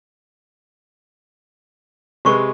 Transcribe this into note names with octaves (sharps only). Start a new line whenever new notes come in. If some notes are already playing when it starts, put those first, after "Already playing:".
C3 G#3 G4 B4 C#6